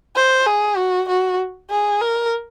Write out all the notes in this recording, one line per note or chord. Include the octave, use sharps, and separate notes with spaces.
C5
G#4
F#4
F#4
G#4
A#4